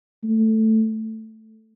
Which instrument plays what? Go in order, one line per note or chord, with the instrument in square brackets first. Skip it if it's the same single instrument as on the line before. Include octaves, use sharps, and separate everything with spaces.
[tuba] A3